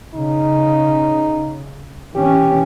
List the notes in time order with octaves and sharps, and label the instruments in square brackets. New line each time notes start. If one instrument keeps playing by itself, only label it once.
[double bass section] C#3 [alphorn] D#4
[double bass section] E3 C#4 [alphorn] G4